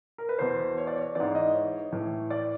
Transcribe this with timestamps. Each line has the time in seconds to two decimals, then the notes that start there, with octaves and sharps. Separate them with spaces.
0.18 A#4
0.29 B4
0.39 E2 B2 C5
0.77 C#5
0.87 D5
0.97 C#5
1.15 G#2 E3 D5
1.35 D#5
1.53 C#5
1.92 A2 E3
2.30 D5